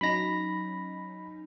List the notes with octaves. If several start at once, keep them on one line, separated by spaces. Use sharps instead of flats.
F#3 C#4 D#4 B5 A#6